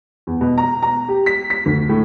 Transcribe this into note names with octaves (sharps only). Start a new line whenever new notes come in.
E2
B2
A#5
A#5
G4
B6
B6
D2
A2